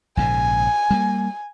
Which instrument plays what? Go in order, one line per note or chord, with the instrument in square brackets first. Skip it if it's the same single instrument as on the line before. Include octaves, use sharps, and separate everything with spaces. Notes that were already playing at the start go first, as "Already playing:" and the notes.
[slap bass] A#1 G#2 C#3 [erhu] G#5
[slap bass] G3 G#3 A#3